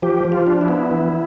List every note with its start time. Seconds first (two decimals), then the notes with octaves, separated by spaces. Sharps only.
0.02 F3 G4
0.25 F3
0.32 F4
0.47 D4
0.61 E4
0.68 B3
0.91 E3